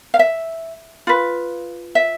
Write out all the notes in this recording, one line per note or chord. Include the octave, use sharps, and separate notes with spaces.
F5
E5
F4 B4
E5